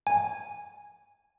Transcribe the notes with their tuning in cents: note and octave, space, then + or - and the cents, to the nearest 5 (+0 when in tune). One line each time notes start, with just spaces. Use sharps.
G#5 -10